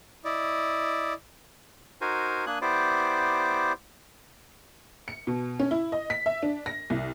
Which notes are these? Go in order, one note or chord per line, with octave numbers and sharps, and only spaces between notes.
E4 D5 D#5
D#4 F#4 A#4 C5 G#5
A#3 D4 G#5 D#6 F#6
B3 E4 G4 C5 D5
C#7
B2
C#4
E4
D#5
B6
E5
D4
A#6
C2